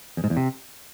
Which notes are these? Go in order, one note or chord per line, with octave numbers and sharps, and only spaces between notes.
E2
G#2
E2
C3